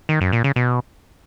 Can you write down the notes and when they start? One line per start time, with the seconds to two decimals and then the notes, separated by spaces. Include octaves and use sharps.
0.09 D#3
0.21 F#2
0.32 A#2
0.44 C#3
0.56 B2